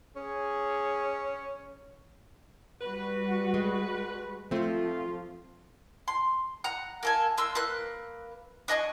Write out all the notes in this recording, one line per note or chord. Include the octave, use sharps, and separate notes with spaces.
C#4 G#4
G3 F#4 B4
G#3
F3 A3 C4 F4
C6
F#5 A#5 F#6
A#3 A4 G#5
A#3 D4 C6 E6
A#3 B4 F#6
D4 D#5 G#5 C#6